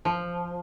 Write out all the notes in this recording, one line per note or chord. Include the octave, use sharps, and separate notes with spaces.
F3